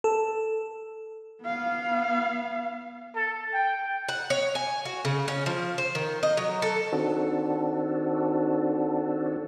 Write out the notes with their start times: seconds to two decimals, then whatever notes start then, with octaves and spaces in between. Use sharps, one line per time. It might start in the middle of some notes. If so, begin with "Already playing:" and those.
0.04 A4
1.42 B3 F5
3.15 A4
3.53 G5
4.09 F#5
4.30 C#5
4.55 G#5
4.85 F#4
5.05 C#3
5.28 C#4
5.46 F3
5.78 C5
5.95 D#3
6.23 D#5
6.37 F#3
6.62 A4
6.93 D#3 C4 D4 F#4 A4